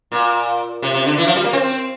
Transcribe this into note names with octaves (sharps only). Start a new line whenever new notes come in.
A#2
C3
C3
D3
E3
F3
G3
A#3
C4